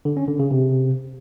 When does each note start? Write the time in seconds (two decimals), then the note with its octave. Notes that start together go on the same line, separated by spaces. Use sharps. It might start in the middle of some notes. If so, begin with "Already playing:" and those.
0.05 D3
0.17 C#4
0.28 D3
0.39 C#3
0.51 C3